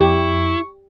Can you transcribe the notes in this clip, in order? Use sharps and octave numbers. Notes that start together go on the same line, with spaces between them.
F2 E4 G4 C#6